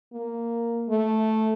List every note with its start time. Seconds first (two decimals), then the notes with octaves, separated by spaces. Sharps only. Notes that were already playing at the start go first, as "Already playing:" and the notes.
0.13 A#3
0.89 A3